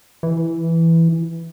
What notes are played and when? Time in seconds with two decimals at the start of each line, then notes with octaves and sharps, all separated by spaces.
0.23 E3